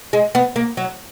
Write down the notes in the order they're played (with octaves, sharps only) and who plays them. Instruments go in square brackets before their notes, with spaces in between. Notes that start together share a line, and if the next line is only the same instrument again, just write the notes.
[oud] G#3
B3
A#3
F#3